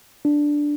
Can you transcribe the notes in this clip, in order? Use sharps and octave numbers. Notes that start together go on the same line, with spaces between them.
D4